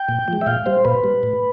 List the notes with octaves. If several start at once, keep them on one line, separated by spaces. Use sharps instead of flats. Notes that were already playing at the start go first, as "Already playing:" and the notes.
Already playing: G5
A#2
F3
G#3
E5
A#2 F5
G3 C5
A#2 B4
G3
A2